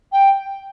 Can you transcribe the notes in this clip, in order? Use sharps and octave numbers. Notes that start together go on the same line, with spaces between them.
G5